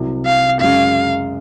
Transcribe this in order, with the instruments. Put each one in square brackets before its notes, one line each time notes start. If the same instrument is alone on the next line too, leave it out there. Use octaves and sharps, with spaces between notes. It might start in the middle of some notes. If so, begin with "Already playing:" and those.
Already playing: [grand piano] C2 C3 F#3
[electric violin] F5
[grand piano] F#2 C#3 G#3 [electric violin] F5